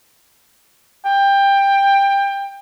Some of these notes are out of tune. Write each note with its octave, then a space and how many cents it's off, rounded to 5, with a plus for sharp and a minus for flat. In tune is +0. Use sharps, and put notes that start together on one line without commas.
G5 +20